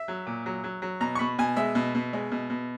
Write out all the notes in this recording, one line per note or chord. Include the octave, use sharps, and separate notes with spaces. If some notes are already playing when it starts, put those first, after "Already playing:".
Already playing: E5
F#3
A#2
F#3
F#3
F#3
B2 A#5
C#6
B2 B5
B2 G#5
G#3 E5
B2
B2
G#3
B2
B2